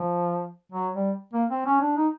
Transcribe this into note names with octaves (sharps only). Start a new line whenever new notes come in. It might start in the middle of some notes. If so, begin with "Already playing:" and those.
Already playing: F3
F#3
G3
A#3
C4
C#4
D4
D#4